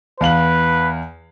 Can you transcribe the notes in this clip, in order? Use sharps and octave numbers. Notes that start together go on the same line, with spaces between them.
E2 B4 F5 F#7